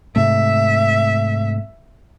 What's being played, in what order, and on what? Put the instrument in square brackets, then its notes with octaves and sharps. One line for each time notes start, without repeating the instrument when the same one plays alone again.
[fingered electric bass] G#2 C3 A3 [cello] E5